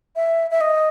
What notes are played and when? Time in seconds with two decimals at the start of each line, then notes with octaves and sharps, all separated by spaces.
0.16 E5
0.51 E5
0.61 D#5